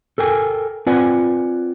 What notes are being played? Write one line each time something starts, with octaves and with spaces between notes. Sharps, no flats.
A4 A#4 G5 G#5
C4 F4 B4 D5 F#5 G#5